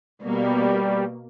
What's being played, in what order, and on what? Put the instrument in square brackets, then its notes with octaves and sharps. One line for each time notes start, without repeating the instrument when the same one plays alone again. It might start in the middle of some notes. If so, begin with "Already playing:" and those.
[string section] B2 A#3 [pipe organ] G3